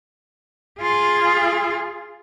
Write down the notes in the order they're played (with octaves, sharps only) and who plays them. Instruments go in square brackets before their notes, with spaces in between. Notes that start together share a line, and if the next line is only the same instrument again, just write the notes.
[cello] F4 G#4